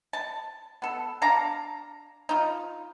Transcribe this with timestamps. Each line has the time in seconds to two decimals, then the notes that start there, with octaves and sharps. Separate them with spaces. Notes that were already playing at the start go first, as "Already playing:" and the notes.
0.13 A5
0.82 B3 A4
1.22 D4 F5 A5 A#5
2.29 D#4 F4